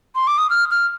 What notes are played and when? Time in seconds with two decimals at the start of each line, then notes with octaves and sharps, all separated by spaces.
0.15 C6
0.27 D6
0.38 D#6
0.50 F6
0.71 F6